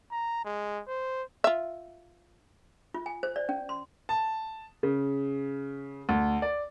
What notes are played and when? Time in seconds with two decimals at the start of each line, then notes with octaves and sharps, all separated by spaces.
0.11 A#5
0.45 G#3
0.88 C5
1.44 F4 E5
2.94 F4
3.06 G#5
3.23 C5
3.36 D5
3.49 C#4
3.69 C6
4.09 A5
4.83 C#3
6.09 D2
6.42 D5